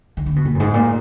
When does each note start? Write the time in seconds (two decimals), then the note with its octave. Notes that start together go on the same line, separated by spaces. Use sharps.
0.17 D#3
0.26 D3
0.36 B2
0.45 A#2
0.55 F#2
0.60 G#2
0.74 A#2